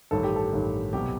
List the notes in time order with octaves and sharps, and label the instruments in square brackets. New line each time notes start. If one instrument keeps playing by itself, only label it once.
[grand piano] A1 G2 D#3 A4
G4
A4
A1 G2 D#3
C2 B2 F#3 G4